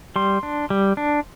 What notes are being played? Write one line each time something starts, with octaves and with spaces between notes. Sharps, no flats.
G3 C6
D4
G3
D4